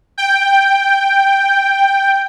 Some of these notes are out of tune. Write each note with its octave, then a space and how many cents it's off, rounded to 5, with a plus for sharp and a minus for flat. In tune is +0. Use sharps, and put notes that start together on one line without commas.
G5 +5